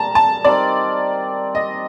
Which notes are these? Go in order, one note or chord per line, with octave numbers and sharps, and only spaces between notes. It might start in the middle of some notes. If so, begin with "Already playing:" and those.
Already playing: A#2 G3 A5 A#5
A5
G3 C4 D#4 A#4 D5
D#5